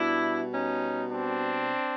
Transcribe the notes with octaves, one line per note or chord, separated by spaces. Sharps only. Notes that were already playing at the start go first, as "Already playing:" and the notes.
Already playing: B2 G3 D4 E4
C#4 D#4
C4 D4